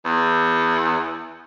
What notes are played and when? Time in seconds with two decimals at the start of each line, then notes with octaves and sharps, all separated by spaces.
0.05 E2